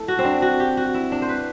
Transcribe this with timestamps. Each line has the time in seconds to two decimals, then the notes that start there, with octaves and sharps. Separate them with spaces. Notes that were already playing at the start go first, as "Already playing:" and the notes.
Already playing: A3 E4 A4
0.08 F#4
0.19 C4
0.25 D4
0.42 F#4
0.60 G4
0.77 F#4
0.94 E4
1.12 D4
1.22 C5
1.29 B4